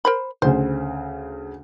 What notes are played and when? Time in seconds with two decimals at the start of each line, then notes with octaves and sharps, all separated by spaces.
0.05 A#4 C5 B5
0.42 D2 C#3 C5